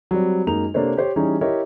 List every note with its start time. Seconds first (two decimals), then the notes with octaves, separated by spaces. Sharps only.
0.11 F#3 G3 C4
0.47 F#2 G#3 A#3 D#4 F7
0.74 C3 A#3 D4 A4 C5 C#5
0.97 G4 C5 C#5
1.16 E3 G3 C#4 D#4 G#4 C#5
1.41 E4 G4 A#4 C#5 D#5 E5